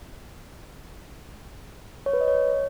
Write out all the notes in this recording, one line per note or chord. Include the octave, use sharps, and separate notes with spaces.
C#5
B4
D#5
C#5